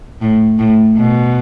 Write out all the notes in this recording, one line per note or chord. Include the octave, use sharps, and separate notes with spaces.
A2
A2
B2